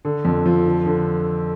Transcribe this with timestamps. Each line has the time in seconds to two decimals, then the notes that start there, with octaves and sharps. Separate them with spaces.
0.05 D3
0.25 F2
0.46 F3
0.65 D3
0.86 D3